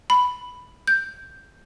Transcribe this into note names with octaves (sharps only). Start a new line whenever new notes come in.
B5
G6